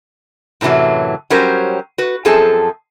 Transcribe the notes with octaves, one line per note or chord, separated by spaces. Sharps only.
F#2 A2 C3 E3 F#3
F#3 G3 C#4 G4 A#4 C5
F#4 B4
F#2 F3 C4 G#4 A4 A5